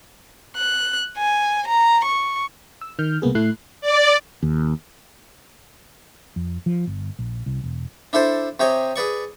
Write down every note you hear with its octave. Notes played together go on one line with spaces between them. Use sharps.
F#6
G#5
A#5
C#6
E6
D#3 F6 G6
C2 A#3 B3 G#4
A2 A3 E4 F#6 C7
D5
D#2
F2
F3
G1
A#1
C2
E1
D4 E4 A4 C5
C3 G4 C#5 D#5 G#5
G#4 B4 D5 C#6